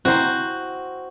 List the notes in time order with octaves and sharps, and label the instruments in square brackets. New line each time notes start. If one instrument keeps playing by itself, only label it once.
[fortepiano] C4 E4 A#5 [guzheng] F#4 C5